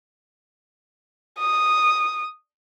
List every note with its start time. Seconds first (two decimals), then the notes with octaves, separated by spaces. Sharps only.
1.39 D#6